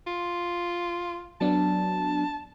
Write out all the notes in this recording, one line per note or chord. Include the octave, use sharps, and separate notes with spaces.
F4
F#3 B3 D4 A5